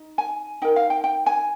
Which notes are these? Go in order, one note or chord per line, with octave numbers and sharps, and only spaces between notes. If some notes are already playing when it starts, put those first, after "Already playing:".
Already playing: D#4
G#5
D#4 A#4 G5
F5
G5
G5
G#5